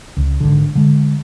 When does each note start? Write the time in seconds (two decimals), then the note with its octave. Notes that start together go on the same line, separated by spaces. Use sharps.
0.17 C#2
0.40 G#1 D3
0.75 D3 G#3